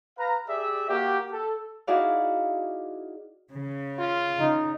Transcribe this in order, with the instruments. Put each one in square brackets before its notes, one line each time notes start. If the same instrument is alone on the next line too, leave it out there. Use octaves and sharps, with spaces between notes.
[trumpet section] B4 F5 A#5
G4 G#4 D5 E5
A#3 F#4 G4
A4
[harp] D#4 E4 F#4 G#4 D5 F5
[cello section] C#3
[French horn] F4
[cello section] C#3 [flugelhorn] D#4